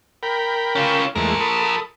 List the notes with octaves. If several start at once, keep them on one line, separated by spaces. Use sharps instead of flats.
A#4 G5 B5
C#4 F4
E2 F3 G#3 A3 A#4
A4 B5 D#6